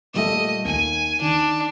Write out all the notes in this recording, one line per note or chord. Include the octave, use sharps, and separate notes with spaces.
A#2 G3 A3 D#5
D#2 G#5 D#7
D#3 D4